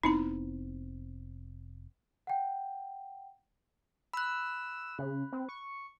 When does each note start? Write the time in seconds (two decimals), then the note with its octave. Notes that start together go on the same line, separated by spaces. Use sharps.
0.03 F1 B3 C4 D#4 E4 A#5
2.27 F#5 G5
4.14 B5 E6 F#6
4.99 C#3
5.32 C4
5.49 C#6